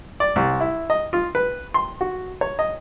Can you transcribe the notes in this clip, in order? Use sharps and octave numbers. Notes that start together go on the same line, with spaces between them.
D5
C2
E4
D#5
F4
B4
C6
F#4
C#5
D#5